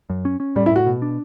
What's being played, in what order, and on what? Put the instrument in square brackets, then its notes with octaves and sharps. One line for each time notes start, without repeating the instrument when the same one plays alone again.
[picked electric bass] F#2
C#4
C#4
[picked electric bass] A2 [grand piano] G3
[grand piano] E4
[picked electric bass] A2 [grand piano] F#4
[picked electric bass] B2
D4